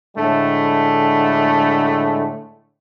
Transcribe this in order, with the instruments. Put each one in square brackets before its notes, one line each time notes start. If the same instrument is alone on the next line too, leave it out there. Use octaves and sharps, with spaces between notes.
[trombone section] A2 D3 G#3 A3